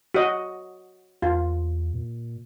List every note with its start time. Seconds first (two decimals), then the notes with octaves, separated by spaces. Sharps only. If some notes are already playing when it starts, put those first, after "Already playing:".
0.14 F#4 D#5
1.22 E2 F4
1.94 A#2